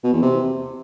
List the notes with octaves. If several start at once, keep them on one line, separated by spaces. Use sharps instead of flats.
B2
E2
C3